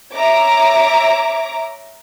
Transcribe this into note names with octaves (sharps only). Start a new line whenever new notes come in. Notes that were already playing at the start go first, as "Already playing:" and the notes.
C#5 E5 A#5 D6